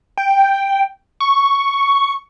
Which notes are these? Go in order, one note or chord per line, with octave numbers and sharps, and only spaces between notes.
G5
C#6